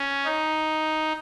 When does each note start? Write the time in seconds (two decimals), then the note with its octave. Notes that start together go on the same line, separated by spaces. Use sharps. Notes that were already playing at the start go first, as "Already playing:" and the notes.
Already playing: C#4
0.25 D#4